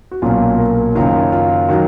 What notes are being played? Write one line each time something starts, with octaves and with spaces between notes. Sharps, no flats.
F#4
B1 A#2 F#3 C#4 F4
A#4
F#1 F#2 D#3 F#3 F4
F4
D#3 F#3 F#4